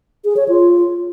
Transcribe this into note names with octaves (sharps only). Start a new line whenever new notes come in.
G#4
C#5
F4